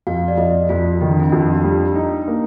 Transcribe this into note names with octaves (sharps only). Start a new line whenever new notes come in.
F2 F5
D5
F2 D#5
F2 F4
D#3 D#4
D4
C4
F2 D4
G3
D#4
A#3